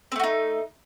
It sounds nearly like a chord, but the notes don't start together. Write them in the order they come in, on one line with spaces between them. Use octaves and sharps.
C4 A3 F#4 D#4